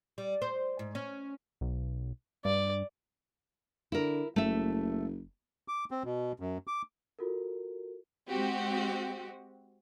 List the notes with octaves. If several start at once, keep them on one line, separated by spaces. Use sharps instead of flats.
G3
C5
G#2
C#4
B1
G2 D5
D3 E4 A#4
F#1 A3 E5
D6
C4
B2
F#2
D6
F4 F#4 A4 A#4
G#3 C4 F#4 G4